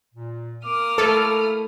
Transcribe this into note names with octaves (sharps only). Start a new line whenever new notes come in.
A#2
A#3 D6 D#6 F6
A3 E4 A4 C#5